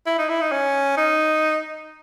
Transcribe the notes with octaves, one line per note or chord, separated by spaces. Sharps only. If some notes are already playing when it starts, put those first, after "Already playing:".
E4
D#4
E4
D#4
C#4
D#4